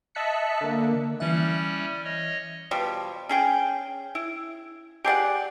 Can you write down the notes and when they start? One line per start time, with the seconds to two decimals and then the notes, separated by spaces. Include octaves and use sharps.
0.15 D#5 E5 A5 F#6 B6 C#7
0.61 D3 A#3
1.20 E3 G3 C#4 E5 F#6
2.04 C#5 D#5
2.71 B2 F3 G3
3.29 C#4 G#4 G5
4.15 E4
5.04 G4 G#4 D5 F#5